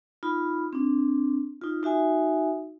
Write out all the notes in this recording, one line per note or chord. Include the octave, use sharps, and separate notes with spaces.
D#4 F4 B5
C4 D4
D#4 F4
D#4 F#4 E5 G#5